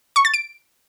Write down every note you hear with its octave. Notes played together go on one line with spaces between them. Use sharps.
C#6
A6
D7